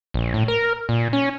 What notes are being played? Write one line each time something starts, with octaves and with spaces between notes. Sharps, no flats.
A#1
A2
A#4
A#2
C#4